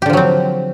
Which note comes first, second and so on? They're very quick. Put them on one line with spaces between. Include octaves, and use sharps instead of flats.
G4 D3 F3 F#3 C4